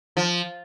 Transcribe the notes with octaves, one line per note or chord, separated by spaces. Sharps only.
F3